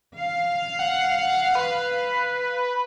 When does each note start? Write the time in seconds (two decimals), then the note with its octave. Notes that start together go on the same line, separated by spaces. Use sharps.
0.17 F5
0.79 F#5
1.55 B4